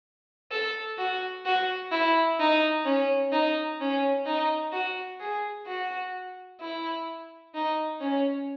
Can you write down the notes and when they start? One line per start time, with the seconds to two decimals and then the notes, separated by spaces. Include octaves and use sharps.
0.51 A4
0.98 F#4
1.45 F#4
1.91 E4
2.39 D#4
2.85 C#4
3.32 D#4
3.80 C#4
4.26 D#4
4.73 F#4
5.20 G#4
5.67 F#4
6.60 E4
7.54 D#4
8.01 C#4